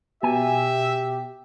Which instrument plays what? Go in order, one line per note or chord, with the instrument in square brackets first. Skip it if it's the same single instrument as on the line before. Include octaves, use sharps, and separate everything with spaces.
[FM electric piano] B2 [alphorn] G4 [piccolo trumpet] E5 [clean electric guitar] G#5